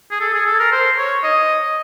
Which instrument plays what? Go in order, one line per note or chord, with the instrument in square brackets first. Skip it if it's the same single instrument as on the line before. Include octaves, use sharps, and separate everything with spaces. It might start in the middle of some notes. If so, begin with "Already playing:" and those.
[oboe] G#4
A4
G#4
A4
A#4
C5
C#5
D#5